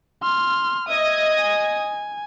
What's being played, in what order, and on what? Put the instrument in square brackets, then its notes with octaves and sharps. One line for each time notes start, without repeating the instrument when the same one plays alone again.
[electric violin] C6 F6
[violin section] D#5 D#6 G#6 [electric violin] E5
[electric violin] G#5